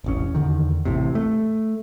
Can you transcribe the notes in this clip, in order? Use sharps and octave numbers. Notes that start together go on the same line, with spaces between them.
E1 A1 C#4
E2 D3 D#3
A1 A2 C3
A3